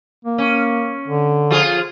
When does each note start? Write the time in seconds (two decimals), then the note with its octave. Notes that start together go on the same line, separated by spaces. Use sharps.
0.25 A#3
0.38 C#4
1.08 D3
1.51 F3 F4 G#4